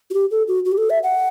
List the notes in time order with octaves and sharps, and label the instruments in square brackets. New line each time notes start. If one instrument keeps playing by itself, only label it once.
[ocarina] F#4
G4
A4
F#4
F#4
G4
A4
E5
F#5